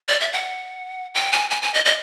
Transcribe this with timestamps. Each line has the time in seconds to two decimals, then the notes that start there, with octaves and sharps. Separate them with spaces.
0.08 D5
0.20 E5
0.33 F#5
1.15 G5
1.33 G#5
1.51 G#5
1.62 G#5
1.74 D#5
1.85 D#5